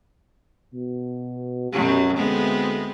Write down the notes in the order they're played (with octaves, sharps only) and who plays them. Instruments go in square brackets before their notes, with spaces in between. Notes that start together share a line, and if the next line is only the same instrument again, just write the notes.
[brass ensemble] B2
[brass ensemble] C2 G4 [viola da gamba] F#2 B2 F#3
[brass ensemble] D2 A3 [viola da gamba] G#3 B3 C4